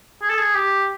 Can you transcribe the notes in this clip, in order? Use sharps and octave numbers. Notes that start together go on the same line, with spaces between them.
G#4
A4
G#4
G4